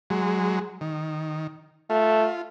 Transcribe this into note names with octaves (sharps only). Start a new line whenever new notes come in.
F#3 G#3
D#3
A3 F4